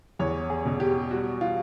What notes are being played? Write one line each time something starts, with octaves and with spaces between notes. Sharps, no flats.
E2 C#5
G#4
B2
G4
G3 F#4
F4